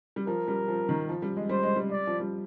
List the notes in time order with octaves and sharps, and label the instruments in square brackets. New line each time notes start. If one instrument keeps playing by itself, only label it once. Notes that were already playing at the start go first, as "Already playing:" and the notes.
[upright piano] G3
[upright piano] F3 [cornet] A#4
[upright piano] G3
F3
D#3
F3
G3
G#3
[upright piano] G3 [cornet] C5
[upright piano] G#3
G3
[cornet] D5
[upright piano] F3
G3